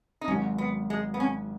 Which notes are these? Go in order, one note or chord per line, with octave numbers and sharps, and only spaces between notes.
D#4
G#1 G#2 F#3 C#4
B3
G#3
B3
C#4